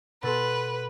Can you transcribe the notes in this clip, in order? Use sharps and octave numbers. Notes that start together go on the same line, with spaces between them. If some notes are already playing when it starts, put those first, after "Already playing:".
B2 A4 B4 C6